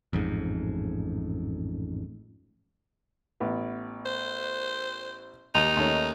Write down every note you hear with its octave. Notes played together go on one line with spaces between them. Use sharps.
A1 F2 G#2
A1 B3
C5
D#2 D#4
D#2 A3 C#4